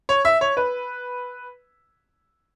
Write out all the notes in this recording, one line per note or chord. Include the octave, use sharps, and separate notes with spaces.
C#5
E5
C#5
B4